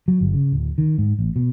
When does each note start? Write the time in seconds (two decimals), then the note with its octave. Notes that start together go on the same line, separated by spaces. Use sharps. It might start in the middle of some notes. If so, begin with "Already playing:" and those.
0.08 F#3
0.21 G1
0.33 C#3
0.52 D1
0.78 D#3
0.98 G#2
1.19 A1
1.36 B2